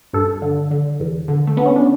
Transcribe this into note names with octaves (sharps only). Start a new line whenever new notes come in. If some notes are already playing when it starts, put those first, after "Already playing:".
G2 A4
D3
D3
E2
D3
A3
D3 B3
C#4
D4